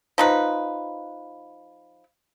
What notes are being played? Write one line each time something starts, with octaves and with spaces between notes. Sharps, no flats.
F3 D#4 B4